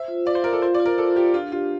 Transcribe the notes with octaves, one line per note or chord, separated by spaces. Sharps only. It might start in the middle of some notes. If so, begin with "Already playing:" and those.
Already playing: C5 E5
F4
D5 F5
C5
F4 A#4
A4
F4 C5
D5
F4
A#4
A4 C5
F4 G4
D4 F4
F4 G4